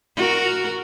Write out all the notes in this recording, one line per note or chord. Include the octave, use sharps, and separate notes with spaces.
F#4 A#4